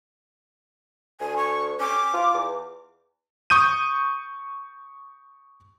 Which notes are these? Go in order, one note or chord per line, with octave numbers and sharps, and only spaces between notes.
D2 G#5
C#6
C#4 D6
F4
E2
C#6 D#6 G6 D#7